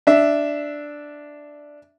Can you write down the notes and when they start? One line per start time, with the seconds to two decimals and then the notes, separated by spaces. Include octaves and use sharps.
0.07 D4 E5